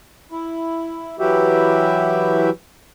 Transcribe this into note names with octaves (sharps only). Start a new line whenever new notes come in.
E4
E3 F#3 E4 F#4 G4 E5